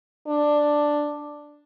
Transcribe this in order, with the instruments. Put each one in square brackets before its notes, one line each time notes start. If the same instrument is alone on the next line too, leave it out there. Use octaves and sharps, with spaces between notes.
[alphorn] D4